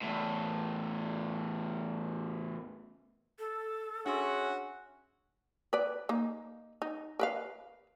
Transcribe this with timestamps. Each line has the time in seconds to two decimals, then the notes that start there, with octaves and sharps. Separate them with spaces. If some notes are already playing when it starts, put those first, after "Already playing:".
0.03 E2 A2
3.39 A4
4.06 C#4 D4 F#4 G#4 E5 F#5 C6
5.73 B4 D5
6.09 A#3 D#4
6.82 D#4
7.19 A#4 B4 F5